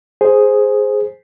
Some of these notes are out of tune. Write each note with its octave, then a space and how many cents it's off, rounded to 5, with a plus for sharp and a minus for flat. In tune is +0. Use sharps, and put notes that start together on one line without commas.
G#4 +0 C5 +0